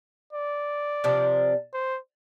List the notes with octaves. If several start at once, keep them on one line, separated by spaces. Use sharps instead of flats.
D5
C3 F3 D4
C5